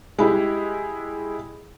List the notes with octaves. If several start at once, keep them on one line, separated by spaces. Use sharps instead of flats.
G#3 E4 G4